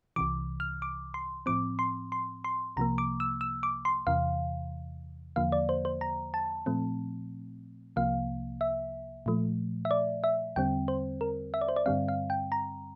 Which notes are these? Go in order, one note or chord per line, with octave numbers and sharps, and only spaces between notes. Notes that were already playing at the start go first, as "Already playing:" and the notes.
C2 C3 E3 D6
F6
D6
C6
A2 F3 C4 D6
C6
C6
C6
C2 C3 F3 A#3 A#5
D6
E6
E6
D6
C6
E2 C3 E3 F5
E2 D3 F3 A#3 F5
D5
C5
C5
A#5
A5
A#2 F3 A3 C4
C2 C3 F3 A#3 F5
E5
A#2 F3 A3
E5
D5
E5
E2 D3 G3 C4 G5
C5
A#4
E5
D5
C5
D5
G2 D3 G3 C4 F5
F5
G5
A#5